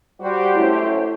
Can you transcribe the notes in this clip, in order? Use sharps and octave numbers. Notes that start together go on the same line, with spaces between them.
G3 F#4 G4 C5
F#2 A3 C#4 E4